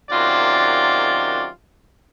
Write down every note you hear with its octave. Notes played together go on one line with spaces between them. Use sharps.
F#2 C3 D#3 F4 F#4 D5